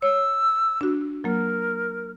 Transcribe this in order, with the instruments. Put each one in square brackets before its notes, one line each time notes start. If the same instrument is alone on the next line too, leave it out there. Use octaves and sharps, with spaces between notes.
[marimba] C#5 [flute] E6
[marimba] D4 F#4
[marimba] F#3 A#3 [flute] A#4